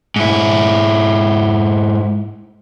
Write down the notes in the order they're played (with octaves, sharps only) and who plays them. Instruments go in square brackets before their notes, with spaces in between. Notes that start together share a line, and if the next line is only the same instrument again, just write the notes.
[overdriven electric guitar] G#2 E4